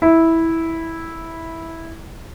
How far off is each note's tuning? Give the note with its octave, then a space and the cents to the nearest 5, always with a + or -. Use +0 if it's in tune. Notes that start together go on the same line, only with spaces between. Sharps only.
E4 -10